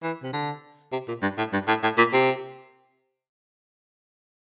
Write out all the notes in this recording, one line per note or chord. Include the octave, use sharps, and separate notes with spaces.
E3
C3
D3
C3
A#2
G2
A2
G2
A2
A2
A#2
C3